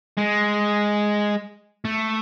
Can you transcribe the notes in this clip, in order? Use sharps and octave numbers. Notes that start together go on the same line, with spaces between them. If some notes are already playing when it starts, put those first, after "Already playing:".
G#3
A3